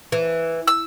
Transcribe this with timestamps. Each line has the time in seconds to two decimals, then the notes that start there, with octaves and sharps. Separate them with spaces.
0.12 E3
0.67 E6